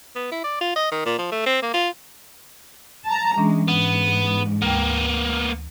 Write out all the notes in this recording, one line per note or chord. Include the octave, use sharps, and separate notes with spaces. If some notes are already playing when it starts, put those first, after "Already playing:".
B3
E4
D5
F4
D#5
D#3
A#2
F3
A3
C4
A#3
F4
A5 A#5
E3 G#3 C#4 D4
G#2 B3
D2 A#3 B3 G5